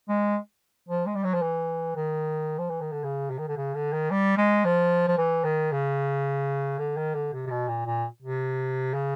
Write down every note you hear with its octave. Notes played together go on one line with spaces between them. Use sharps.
G#3
F3
G#3
G3
F#3
F3
E3
D#3
F3
E3
D#3
D3
C#3
C3
D#3
D3
C#3
D3
D#3
G3
G#3
F3
F3
E3
D#3
C#3
D3
D#3
D3
C3
C3
B2
A#2
A#2
C3
C#3